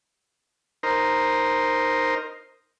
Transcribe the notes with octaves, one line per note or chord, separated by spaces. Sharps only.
D#4 A#4 C5